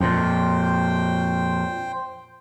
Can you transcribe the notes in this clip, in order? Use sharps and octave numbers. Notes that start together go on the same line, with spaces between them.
F2 A#2 C5 G5